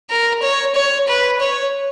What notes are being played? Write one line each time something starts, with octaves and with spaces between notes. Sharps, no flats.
A#4
C#5
C#5
B4
C#5